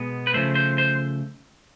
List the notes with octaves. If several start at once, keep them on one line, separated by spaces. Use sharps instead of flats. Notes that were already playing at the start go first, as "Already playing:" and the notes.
Already playing: B2 G#3 B3
B4
C#3 F3 A3 C5
C5
C5